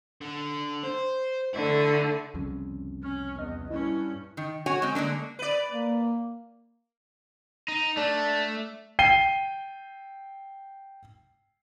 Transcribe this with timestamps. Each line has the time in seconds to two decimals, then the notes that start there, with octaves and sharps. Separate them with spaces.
0.21 D3
0.83 C5
1.54 D3 A3 E4
2.34 C2 F2 C#3
3.03 C#4 F6
3.39 E2 D#5
3.70 G2 C#4 E4
4.37 D#3
4.66 F#4 C#5 F#5 G#5
4.82 G#3 C4
4.95 D3 G#3 A#3 D4
5.39 B4 D5
5.72 A#3
7.68 D#4
7.97 A3 D4
8.99 G5 C7 D#7 G7